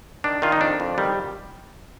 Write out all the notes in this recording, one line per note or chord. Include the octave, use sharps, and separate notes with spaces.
D#3 D4
D#3 F4
D#4
F2 D4
F2
D#3 G3